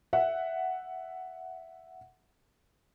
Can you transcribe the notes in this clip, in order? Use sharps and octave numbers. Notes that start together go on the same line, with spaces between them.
E5 F#5